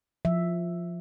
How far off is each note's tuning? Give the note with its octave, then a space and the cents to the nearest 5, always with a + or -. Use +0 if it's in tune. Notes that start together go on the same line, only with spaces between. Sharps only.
F3 +0 E5 +0